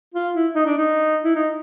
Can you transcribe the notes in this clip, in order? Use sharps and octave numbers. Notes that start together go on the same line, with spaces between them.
F4
E4
D#4
D4
D#4
E4
D#4